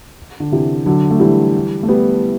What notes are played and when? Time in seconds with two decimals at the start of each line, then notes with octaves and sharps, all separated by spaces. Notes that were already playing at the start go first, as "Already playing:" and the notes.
0.40 D3
0.52 C3 E3
0.86 D3 F#3
1.11 A3
1.20 E3 G3
1.83 A3
1.89 G3 B3